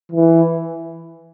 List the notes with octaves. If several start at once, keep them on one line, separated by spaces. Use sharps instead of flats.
E3